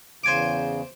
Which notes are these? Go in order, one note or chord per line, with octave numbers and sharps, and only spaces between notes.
E2 C#3 C5 G#5 D6